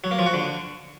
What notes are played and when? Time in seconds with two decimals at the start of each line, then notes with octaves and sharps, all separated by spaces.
0.04 F#3
0.11 A#3
0.19 F3
0.26 F#4
0.34 D3